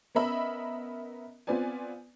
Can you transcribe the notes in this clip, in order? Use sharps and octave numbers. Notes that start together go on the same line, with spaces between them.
B3 C#4 A#4 D#5 E5 B5
B3 C4 F4 B4 D5 G#5